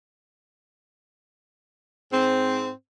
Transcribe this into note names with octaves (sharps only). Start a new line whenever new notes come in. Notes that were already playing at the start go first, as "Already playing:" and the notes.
G#2 C4